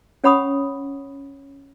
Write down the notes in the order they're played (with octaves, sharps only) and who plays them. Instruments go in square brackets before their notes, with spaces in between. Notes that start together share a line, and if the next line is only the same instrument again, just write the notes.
[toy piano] C#4 C#5 F#5 B5 C#6 D#6